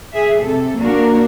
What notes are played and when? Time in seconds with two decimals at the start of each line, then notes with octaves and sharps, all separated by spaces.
0.13 G#4 E5
0.42 C3 A4
0.79 A#3 D4 F#4 A#4